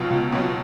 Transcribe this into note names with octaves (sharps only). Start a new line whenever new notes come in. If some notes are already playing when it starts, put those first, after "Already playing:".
Already playing: C#2 B2 F#3 F4
C#2
B2 F#3